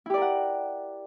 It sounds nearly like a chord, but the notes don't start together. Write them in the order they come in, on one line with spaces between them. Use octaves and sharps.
E4 G4 D5 A#4 F#5